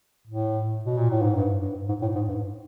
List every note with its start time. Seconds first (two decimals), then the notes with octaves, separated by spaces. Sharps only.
0.27 A2
0.85 B2
0.97 A#2
1.10 A2
1.22 G#2
1.35 G2
1.62 G2
1.89 G#2
2.02 A2
2.15 G#2
2.28 G2